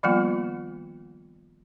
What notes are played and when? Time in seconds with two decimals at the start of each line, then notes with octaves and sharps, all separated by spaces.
0.03 D#3 F3 G3 A#3 B3 F4